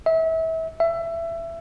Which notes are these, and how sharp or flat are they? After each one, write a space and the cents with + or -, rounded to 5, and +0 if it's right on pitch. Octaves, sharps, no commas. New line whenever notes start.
E5 -30
E5 +20